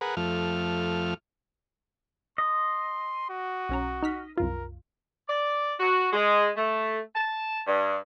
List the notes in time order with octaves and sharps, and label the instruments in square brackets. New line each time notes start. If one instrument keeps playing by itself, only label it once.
[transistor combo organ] G#4 A#4 B4 F#5
F2 F3 A3 F6
[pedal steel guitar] D#5 [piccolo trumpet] C6
[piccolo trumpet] F#4
[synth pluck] B1 C#4 A#5
D#4 F6 B6
[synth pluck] C2 F#2 F4 [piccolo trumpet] A#4
[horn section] D5
F#4
G#3
A3
A5
G2